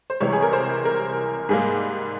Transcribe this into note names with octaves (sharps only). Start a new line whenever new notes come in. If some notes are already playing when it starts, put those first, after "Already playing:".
C5
C#2 C3 E3 G3 C#5
G#4
A#4
C5
A#4
G#2 G3 A#3 G#4